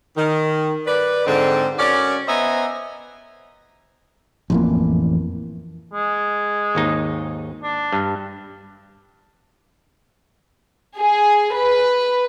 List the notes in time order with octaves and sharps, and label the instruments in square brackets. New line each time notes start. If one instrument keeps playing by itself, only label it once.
[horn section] D#3
B4 D5
G#2 D3 C4
C#4 F#4 A#4 C#5 D5
B3 C5 D#5 E5 G#5 A#5
[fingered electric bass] A1 E3 A#3 [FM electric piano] F2
[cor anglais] G#3
[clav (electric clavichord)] G#1 D#2 D#4
[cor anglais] D4
[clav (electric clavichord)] G2
[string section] G#4
B4